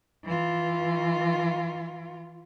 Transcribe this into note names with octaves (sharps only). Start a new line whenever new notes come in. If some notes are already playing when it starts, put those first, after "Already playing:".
E3 F4